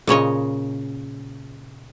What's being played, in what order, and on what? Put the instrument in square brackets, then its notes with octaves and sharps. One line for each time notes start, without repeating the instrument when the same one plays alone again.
[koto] A#2 C#3 C#5 D#5